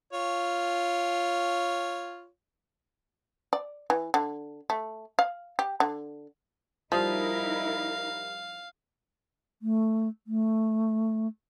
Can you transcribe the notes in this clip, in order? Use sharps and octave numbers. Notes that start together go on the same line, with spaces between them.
F4 C#5
D5
E3
D3
A3
F5
G4
D3
F3 G3 D#4 E4 A#4 F5 D#6
A3
A3